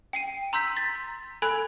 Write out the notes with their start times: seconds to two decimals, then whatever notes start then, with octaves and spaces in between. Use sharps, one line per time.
0.13 G5 C7 D#7
0.53 A#5 C6 E6 G6 B6
0.77 A6 B6
1.42 A4 G#5 B5 F#6 G#6